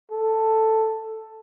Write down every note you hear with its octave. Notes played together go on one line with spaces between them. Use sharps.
A4